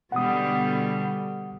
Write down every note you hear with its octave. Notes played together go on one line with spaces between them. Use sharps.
B2 D3 G3 F#5 D#6